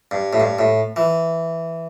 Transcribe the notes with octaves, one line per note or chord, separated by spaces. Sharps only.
G2
A2
G2
A2
E3